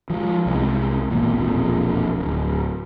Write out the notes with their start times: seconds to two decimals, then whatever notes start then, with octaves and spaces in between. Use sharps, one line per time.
0.10 F3 G#3
0.46 C2 F#3 G#3
1.11 G#1 E2 A#2
1.36 E1 A#1 F2
2.18 D1